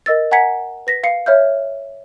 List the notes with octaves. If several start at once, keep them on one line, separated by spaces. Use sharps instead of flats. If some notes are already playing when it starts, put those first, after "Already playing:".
A#4 D#5 E6 A6
F#5 G#5 A#5 G#6 B6 C#7
B4 A#6 B6
F5 C7 C#7
C#5 E5 F6 G6